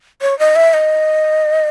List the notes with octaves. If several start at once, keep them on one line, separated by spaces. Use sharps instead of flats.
C#5
D#5
E5
D#5